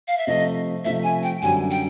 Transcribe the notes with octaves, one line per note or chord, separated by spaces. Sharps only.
F5
E5
C3 F3 A3 D#5
C3 F3 A3 E5
G#5
G5
F#2 D3 G3 G#5
G5